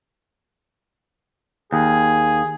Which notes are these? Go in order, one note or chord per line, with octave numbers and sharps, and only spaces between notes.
D#2 G#4